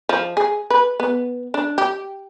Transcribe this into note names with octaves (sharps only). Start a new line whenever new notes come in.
F3
G#4
B4
B3
D4
G4